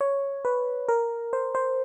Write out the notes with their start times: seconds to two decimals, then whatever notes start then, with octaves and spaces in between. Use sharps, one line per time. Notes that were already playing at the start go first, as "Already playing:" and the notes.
0.01 C#5
0.45 B4
0.88 A#4
1.33 C5
1.55 C5